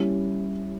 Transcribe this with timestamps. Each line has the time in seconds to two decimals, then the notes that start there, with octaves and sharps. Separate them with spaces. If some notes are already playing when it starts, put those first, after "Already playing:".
Already playing: G3 C#4 E4